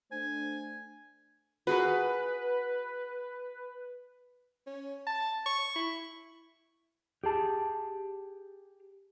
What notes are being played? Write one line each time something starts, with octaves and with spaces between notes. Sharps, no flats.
A3 D4 C5 G#5
F#4 G#4 A#4 B4
C#4
A5
C#6
E4
G4 G#4 A5